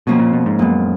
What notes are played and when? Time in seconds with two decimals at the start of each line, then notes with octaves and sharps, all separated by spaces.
0.07 F2 B2 F3 A#3 C#4
0.20 A#2
0.33 B2
0.46 G#2
0.59 F#2 A#2 G#3 B3